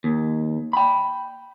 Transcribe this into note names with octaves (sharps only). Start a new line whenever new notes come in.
D#2
G5 B5